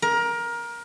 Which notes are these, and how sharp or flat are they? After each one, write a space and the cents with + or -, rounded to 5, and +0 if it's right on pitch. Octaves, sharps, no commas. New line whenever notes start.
A#4 +20